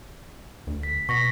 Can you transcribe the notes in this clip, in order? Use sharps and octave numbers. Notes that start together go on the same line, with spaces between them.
D2
B6
B2 C#6 A#6 B6